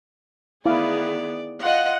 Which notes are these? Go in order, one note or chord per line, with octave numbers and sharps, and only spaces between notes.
D#3 B3 E4 G#4 D5 F5 D6
F4 D#5 F#5